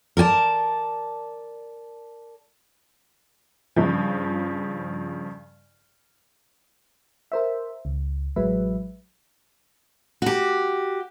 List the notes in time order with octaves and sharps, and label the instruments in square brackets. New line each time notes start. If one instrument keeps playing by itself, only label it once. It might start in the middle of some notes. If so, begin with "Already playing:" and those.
[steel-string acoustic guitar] A#4 D5 G#5 A5
[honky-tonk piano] G2 C#3 F3
[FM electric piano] A#4 C5 E5
C#2
A1 F#3 G#3 B4 E5
[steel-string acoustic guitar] F#4 G4